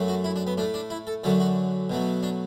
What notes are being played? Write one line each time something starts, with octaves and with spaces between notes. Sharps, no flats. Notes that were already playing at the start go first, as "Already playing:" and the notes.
Already playing: F#2 F#3 A3
F#4
E4
D4
B3
A2 A3 D4
D4
E4
A4
F#2 D3 F#3 A3 A4
F#4
B2 F#3 A3
D4